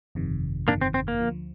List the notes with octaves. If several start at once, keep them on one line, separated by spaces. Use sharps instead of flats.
G1 F2 C3 D#3
G1 F2 C3 D#3 A#3 D4
C4
C4
A#3
D2 D3 F3